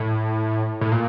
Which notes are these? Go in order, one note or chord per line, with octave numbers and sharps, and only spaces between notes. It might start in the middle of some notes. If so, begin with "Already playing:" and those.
Already playing: A2
A2
A#2